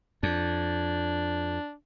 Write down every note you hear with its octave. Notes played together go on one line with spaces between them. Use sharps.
F2 D4